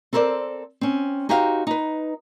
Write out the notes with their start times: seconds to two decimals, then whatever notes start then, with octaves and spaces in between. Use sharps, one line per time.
0.13 C4 A4 A#4 C5 D5
0.81 C4 C#4
1.29 D#4 F#4 G4 C5 F5
1.67 D#4 B4